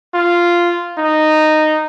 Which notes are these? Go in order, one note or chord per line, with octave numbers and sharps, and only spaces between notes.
F4
D#4